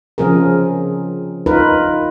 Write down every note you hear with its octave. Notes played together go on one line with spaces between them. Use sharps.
C#3 F3 C4 G#4 A#4
D#4 F4 A#4 B4